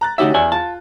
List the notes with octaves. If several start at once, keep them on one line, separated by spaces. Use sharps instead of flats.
A#5 F#6 A6
D2 C#4 D#4 F#4 G4 E5
E2 D5 E5 G#5
F4 A5